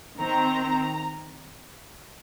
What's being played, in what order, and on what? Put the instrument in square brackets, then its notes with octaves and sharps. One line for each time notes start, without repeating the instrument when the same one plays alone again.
[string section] D#3 C4 A#5